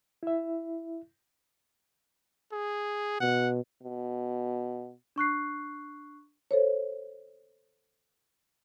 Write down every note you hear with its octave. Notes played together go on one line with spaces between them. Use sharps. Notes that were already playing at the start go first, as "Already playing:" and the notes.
E4 E5
G#4
B2 F#5
B2
D4 C#6 F#6 C7
A4 C5 C#5